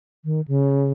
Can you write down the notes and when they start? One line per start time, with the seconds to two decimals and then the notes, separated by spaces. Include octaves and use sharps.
0.25 D#3
0.48 C#3